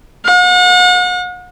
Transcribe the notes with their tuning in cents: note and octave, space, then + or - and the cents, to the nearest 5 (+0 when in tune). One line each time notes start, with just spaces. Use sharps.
F#5 -40